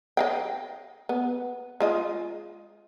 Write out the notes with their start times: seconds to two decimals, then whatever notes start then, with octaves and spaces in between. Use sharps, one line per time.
0.17 D#5 F5 G5
1.09 B3
1.80 G#3 F4 D#5